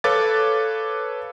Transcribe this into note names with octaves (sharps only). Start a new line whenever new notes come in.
A4 B4 C#5 F5 D6 A6